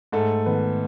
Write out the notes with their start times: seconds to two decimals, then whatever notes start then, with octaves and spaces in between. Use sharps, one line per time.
0.12 G#2 A3 A4
0.46 D#3 B3 B4